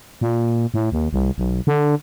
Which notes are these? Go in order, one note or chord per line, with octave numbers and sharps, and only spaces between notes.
A#2
A2
D#2
C2
B1
D3